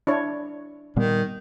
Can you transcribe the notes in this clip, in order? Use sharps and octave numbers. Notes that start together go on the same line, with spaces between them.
D4 E4 C#5
A#2 D#3 G3 B3